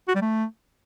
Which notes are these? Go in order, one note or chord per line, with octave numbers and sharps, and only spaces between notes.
F#4
G3
A3